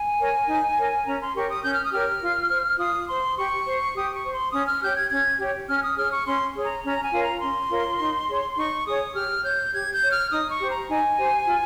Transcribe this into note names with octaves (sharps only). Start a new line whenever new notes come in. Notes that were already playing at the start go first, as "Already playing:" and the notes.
Already playing: G#5
A#4 C#5
D#4
A#4 C#5
C#4 A#5
C6
G4 A#4 C#5 C#6
D#6
C#4 G6
F6
D#6
G4 A#4 C#5 F6
F4
C5
F4 D#6
C5 C6
G4 C#6
C5
G4 D#6
C#6
C5
C6
C#4 D#6
F6
G4 C#5 G6
G#6
C#4 G#6
G4 C#5
C#4 F6
D#6
G#4 C#5 F6
C#6
C#4 C6
G#4 C#5
A#5
C#4 A#5
G#5
F4 A#4 C#5
A#5
C#4 C6
F4 A#4 C#5
D#4
G#4 C#5
D#4 C#6
G#4 C#5 D#6
G4 F6
C#5 G6
G4 G#6
G6
C#5
F6
D#4 D#6
C#6
G4 C5
A#5
D#4 G#5
G4 C5
F4